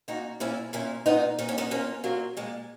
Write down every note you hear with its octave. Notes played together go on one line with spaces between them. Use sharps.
A#2 D#4 F#4
A#2 C#4 E4
A#2 C#4 E4
A#2 B3 D#4
A#2 D#4
C#4
B3 D#4
A#2 A#3 C#4
A#2 F#3 A#3
A#2 G#3